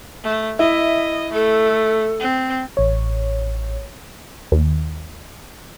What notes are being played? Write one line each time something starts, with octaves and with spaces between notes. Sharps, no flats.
A3
E4 D#5 E5
A3 A4
C4
A1 C#5
D#2